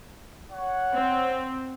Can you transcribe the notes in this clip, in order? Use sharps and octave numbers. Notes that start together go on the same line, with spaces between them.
C#5 F#5
C4